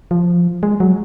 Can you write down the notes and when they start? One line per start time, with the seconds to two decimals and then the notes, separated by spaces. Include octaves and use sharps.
0.11 F3
0.63 G#3
0.80 F#3